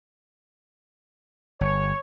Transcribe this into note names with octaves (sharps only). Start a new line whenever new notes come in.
G1 C#5